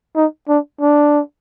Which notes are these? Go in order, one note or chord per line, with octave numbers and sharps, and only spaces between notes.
D#4
D4
D4